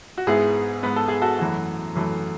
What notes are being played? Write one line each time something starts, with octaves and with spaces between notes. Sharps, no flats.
F#4
G#2 G#3 B3 E4 G#4
G#2 G#3 B3 B4
A4
G#4
F#4 A4
F#2 E3 A3 F#4
F#2 E3 A3